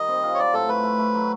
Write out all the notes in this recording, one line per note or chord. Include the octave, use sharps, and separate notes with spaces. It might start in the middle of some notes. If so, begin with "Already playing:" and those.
Already playing: D#3 G3 D#5
C4
F4
C#5
F#3 D5
A2 A4
A3 B4
A3
A3
F#3